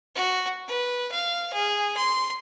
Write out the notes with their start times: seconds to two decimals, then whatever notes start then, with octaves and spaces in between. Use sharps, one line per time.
0.15 F#4
0.68 B4
1.12 F5
1.53 G#4
1.97 C6